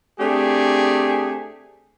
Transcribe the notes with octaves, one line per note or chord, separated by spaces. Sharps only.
A3 C4 D4 G4 G#4